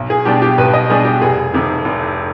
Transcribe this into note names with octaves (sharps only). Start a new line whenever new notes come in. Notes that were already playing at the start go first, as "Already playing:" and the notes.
Already playing: B1
G#4
B2 G3 D4 G4
G4
B1 B4
D#5
B2 G3 D4 G#4
G4
F1 G#4
F2 C3 D#3
F1